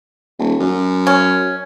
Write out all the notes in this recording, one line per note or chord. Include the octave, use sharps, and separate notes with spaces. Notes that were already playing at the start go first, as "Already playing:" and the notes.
D#1
F#2
C#4